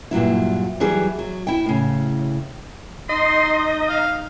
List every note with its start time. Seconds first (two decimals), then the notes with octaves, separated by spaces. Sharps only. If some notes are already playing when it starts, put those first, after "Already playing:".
0.11 G2 A#2 F#3 E4
0.80 E3 F#3 G3 G#4
1.19 F#3
1.47 E4 G5
1.66 A2 C#3
3.09 D#4 D#5 C6
3.89 F5